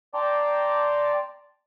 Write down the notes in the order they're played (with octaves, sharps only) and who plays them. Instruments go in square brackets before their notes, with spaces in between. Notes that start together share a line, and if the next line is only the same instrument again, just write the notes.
[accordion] D5 G5 A5 A#5 C6 D6